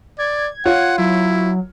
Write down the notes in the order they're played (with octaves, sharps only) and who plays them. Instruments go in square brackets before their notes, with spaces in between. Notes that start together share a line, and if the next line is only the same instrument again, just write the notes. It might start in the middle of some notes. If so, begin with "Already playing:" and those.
[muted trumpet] D5 [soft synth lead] G#6
[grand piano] F4 C#5 [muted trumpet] F#5
[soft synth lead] F#3 [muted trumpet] E4